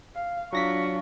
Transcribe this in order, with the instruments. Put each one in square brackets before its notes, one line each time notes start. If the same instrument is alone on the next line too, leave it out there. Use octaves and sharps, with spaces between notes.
[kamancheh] F5
[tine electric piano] F#3 A#6 B6 [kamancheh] D4 F4 [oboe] C#6